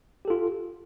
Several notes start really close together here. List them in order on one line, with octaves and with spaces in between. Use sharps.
G4 A4 F4